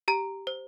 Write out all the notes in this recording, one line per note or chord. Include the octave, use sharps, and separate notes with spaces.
G4 A#5
C5